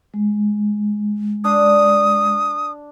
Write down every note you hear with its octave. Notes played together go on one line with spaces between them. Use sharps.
G#3
D4 D#6